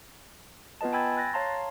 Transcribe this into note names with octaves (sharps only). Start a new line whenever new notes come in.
B3 F4 B4 D#5 A5
G5 G#5 B5 E6 G#6 A6
F#6 A6 A#6
C#5 F5 A5 A#5 C6